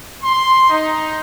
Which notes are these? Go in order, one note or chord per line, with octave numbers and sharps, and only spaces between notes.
C6
D#4